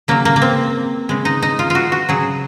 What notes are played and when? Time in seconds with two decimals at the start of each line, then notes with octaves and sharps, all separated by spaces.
0.08 C#3 F#3 A#3
0.25 A#3
0.36 A#3
0.42 C4
1.09 C#3 G#3
1.25 D#4
1.42 D#4
1.59 F4
1.70 F4 F#4
1.92 F#4
2.09 C#3 F#3 G#4